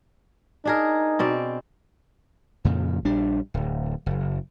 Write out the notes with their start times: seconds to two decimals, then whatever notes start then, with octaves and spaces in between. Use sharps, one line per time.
0.65 D4 D#4 G#4 A#4
1.19 B2 C4 D5
2.65 F2 A#2 C#3
3.05 A#1 G3 D4
3.54 D1
4.06 F#1